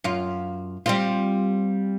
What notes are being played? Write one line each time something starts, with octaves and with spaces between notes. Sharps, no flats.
F#2 F4
G3 C4 F4